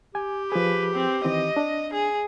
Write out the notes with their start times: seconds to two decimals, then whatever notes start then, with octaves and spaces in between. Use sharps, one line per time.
0.15 G4 G#5
0.52 F3 G#4 B4
0.94 C4
1.25 D#3 E3 C4 D#5
1.57 D4
1.93 G#4